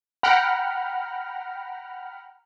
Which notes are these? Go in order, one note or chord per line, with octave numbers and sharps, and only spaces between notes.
F#5 G5 A#5 B5 F6